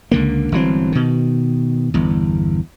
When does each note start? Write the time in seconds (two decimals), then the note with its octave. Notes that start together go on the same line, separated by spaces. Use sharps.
0.11 C#2 D3 A#3
0.52 G1 E3 F#3 C4
0.92 B2 D#3
1.94 G1 E2